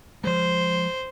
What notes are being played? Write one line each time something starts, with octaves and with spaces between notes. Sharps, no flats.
F3 G#3 C5